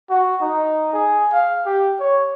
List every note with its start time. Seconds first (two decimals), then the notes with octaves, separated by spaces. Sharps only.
0.10 F#4
0.41 D#4
0.93 G#4
1.32 F5
1.66 G4
2.00 C#5